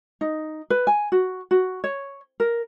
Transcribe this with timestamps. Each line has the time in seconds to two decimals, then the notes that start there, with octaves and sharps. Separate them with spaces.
0.21 D#4
0.70 B4
0.87 G#5
1.12 F#4
1.51 F#4
1.84 C#5
2.40 A#4